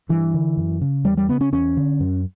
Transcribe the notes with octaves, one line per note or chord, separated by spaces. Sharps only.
G2 E3
D3
F#2
C#3
E2 G3
G3
C#3 B3
C#4
E2 C#4
D3
F#2